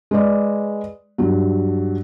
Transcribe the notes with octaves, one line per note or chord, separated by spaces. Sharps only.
G#3 B4 D5
G2 F#3